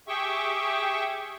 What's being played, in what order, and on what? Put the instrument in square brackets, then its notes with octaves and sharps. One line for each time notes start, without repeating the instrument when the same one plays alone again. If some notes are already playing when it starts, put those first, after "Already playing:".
[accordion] G4 G#4 E5 G5 C#6